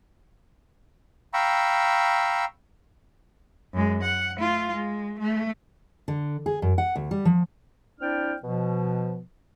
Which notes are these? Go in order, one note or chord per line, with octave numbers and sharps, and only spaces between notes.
F5 G5 A#5 B5 C#6 E6
F#2 G#3
F#5
A3 F4
G#3
A3
D3
G#4
F#2
F#5
D2
G3
F3
C4 D4 E4 D5 G5 F6
B2 F3